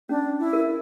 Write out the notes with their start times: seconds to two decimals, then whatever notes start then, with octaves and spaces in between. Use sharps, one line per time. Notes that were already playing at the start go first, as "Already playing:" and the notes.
0.09 C#4 D4
0.39 E4
0.53 A#4